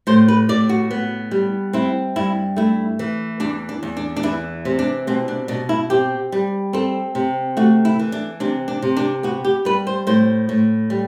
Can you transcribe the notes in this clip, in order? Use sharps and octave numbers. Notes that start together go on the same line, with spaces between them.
A2 C5
B4
A2 D5
F#4
B3
G3
C4 E4
G2 E4
A3 E4
E3
E2 D4
D4
E2
D4
D4
E3 E4
C3
D4
B2 C4
D4
B2 D4
E4
C4 G4
G3
C4 A4
C3
A3 F#4
E4
E3
D4
C3 D4
D4
C3
D4
B3 F#4
G4
G3 B4
C5
A2 C5
A2
G3